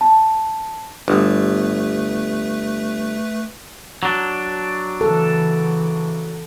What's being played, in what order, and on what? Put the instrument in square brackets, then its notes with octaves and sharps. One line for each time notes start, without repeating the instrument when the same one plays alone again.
[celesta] A5
[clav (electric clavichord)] G1 [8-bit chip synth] A3 B4
[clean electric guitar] F#3 D4
[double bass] C#3 E3 [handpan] A4